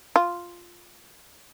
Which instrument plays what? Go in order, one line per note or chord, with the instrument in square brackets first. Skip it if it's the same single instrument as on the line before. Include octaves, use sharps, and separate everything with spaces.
[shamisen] F4